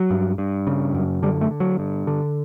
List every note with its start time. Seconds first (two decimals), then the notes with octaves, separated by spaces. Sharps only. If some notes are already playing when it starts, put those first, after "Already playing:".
Already playing: F#3
0.10 G2
0.38 G2
0.67 C#3
0.94 F#2
1.23 D3 G3
1.41 A3
1.51 D3
1.60 F#3
1.79 G2
2.07 D3